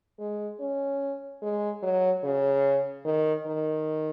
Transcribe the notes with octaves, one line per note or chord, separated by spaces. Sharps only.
G#3
C#4
G#3
F#3
C#3
D#3
D#3